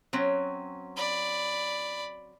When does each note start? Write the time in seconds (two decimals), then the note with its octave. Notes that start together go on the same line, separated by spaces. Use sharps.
0.13 F#3 C4 C#4
0.96 D5 B5